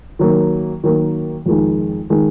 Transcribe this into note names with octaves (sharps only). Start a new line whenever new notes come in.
D#3 F#3 A#3
D#3 F#3 A#3
F2 D#3 G#3 D#4
D#3 G#3 D#4